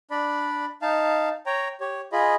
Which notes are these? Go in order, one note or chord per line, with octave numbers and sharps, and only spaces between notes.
D4 D5 B5
D#4 F5 A5
C#5 G5 A#5
G4 C#5
F4 G#4 D#5 B5